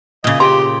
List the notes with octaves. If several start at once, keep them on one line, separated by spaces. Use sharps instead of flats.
A#2 C#3 D#5
G4 A#5 C6